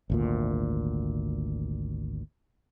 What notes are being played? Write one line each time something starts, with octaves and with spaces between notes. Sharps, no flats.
G#1 D2 A#2